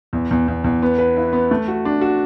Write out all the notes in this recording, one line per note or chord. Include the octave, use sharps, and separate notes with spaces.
E2
E2
E2
E2
B3
B4
E4
B3
A3
F#4
D4
F#4